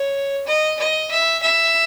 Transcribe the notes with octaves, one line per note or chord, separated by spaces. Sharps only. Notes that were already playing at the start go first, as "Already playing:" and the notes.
Already playing: C#5
D#5
D#5
E5
E5